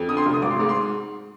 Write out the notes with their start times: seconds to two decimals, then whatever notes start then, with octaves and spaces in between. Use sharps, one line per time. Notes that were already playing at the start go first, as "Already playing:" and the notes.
Already playing: F2
0.08 D3 D#6
0.17 C6
0.26 F1
0.34 D#6
0.42 G#1 D6
0.51 C6
0.60 G#2 D6
0.69 C6